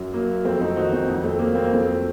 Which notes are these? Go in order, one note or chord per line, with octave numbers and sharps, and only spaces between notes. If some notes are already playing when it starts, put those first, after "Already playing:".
Already playing: F#2 F#3
F#3 A#3
F2 A3 C4
C4 D#4
D#3 D#4 F#4
C4 D#4
F2
A3 C4
F#3 A#3
C4
A#3
F2 A3 C4